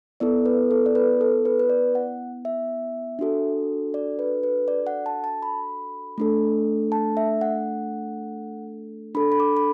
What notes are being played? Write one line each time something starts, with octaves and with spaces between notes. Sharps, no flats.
B3 E4 A4 D5
B4
A4
D5
B4
A4
B4
B4
D5
F#5
E5
D4 F#4 A4
D5
B4
B4
D5
F#5
A5
A5
B5
A3 D4 A4
A5
E5
F#5
D4 A4 B5
B5
D6
B5